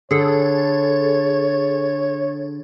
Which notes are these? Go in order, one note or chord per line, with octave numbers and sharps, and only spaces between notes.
D3 G#4 A4 C#5